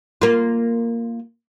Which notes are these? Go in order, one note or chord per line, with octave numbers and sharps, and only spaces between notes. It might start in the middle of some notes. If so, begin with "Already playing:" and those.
A#3 F4